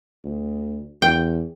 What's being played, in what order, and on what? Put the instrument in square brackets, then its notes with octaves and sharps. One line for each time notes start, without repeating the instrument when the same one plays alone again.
[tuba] D2
[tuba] E2 [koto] G5